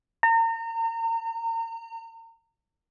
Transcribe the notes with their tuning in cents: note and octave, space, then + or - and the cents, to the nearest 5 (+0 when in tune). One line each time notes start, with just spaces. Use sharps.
A#5 -35